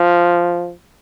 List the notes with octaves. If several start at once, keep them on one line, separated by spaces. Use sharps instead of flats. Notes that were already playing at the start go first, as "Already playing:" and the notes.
Already playing: F3